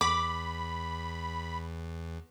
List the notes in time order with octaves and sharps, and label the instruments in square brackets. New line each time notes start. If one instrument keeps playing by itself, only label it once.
[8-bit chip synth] E2 [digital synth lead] B5 [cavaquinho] D6